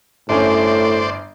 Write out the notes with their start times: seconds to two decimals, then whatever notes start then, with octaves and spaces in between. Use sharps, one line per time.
0.29 G1 A2 C#4 C5 D5